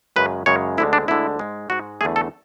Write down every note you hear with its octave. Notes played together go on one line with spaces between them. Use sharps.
F#2 C#3 G#3 B4
F#2 C#3 G#3 C#5
D2 D3 G#3 E4
D4
D2 D3 G#3 E4
G#2 G#3
G#2 G#3 F#4
E2 D3 A3 G#4
A4